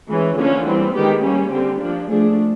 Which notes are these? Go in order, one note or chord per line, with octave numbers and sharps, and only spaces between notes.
E3 G#3 C#4
D3 F3 A#3 C#4 G#4
E3 G3 C4
D#3 G#3 B3 G4
G3 A#3 C#4
D3 G3 C4 G4
F3 A#3 D4
F3 A3 D4 G#4